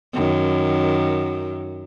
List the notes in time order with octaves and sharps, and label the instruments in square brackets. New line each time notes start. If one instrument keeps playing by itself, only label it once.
[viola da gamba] F#2 D#3